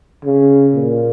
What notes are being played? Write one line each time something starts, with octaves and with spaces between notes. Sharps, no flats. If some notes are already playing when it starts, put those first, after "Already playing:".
C#3
A#2